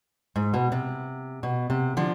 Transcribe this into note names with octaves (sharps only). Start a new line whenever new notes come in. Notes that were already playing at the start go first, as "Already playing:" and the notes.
G#2
B2
C3
B2
C3
D3 F3